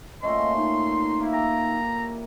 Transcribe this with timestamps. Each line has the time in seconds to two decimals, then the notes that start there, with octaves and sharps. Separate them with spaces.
0.23 A#2 A3 C#4 D#5 C6
0.57 D#4
1.20 A#3 E4 E5
1.33 G4 A#5